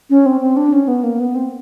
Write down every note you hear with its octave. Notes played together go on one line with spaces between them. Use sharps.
C#4
C4
C4
D4
C#4
B3
A#3
B3
C4